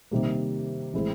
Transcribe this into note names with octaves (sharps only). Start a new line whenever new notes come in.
C3 D#3 G3 A#3
A2 E3 G#3 C4 E4